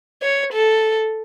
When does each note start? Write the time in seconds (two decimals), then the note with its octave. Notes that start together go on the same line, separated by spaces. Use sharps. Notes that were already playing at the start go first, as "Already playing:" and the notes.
0.22 C#5
0.53 A4